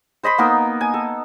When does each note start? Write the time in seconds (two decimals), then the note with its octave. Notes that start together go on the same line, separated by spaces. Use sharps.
0.23 C5 D#5 B5 C6
0.38 A#3 B3 D#4 A#4
0.81 G#5
0.94 A4